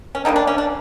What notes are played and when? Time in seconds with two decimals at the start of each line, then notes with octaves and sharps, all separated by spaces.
0.15 C#4
0.25 D3 G3 A#3 D#4
0.36 D4
0.47 C#4
0.58 D4